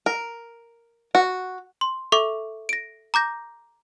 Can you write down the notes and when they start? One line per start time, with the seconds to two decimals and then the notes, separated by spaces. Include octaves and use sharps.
0.06 A#4
1.15 F#4
1.81 C6
2.12 A4 E5 C#6 D6
2.69 A#6 D7
3.14 A#5 D6 G6 A#6